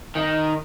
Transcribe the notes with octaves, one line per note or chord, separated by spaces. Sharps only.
D#3